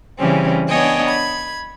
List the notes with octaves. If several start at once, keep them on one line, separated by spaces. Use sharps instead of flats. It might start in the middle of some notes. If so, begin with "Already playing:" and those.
C#3 E3 G3 C4 C#4
B3 D4 C#5 D#5 G5 G#5
B5 G#6